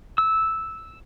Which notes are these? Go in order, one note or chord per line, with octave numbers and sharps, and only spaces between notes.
E6